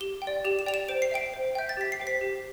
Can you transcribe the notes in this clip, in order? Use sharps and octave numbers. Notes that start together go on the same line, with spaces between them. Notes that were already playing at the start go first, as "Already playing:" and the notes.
G4 G7
G5
D5
G4 F7
E7
D5 G5 F7
E7
C5 D7
C7
E5 G5 D7
C5
E5 G5 G6
A6
G4 B6
C7
C5 G5
B6
G4